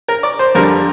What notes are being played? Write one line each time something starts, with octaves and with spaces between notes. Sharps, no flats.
A#4
D5
C5
F2 D3 G3 A#4